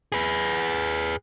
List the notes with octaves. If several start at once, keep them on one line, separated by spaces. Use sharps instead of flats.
G#4 B4